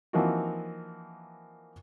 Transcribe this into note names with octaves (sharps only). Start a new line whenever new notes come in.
E3 F3 A#3 C4 D#4 F#4